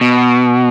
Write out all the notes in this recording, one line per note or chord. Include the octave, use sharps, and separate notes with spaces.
B2